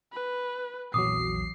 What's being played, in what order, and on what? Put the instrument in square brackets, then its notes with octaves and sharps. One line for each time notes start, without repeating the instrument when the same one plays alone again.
[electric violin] B4
[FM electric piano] A#1 E2 F#3 [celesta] D6 D#6 [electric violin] C7